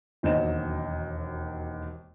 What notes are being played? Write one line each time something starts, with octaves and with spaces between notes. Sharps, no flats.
E1 D#2 F#3 C5 D#5 E7